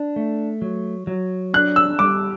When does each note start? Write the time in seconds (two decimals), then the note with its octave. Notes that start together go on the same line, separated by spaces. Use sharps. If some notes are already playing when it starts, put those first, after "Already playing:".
Already playing: D4
0.16 A3
0.62 F#3
1.07 F#3
1.54 D4 F#6
1.76 E6
1.99 G3 D6